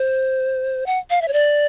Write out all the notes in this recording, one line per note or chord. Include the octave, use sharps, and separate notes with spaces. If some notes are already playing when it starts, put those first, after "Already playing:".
Already playing: C5
F#5
F5
E5
C#5
D5